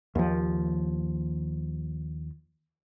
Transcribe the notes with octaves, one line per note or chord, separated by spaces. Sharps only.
D#2 F3